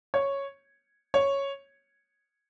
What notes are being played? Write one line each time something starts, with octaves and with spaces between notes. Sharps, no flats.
C#5
C#5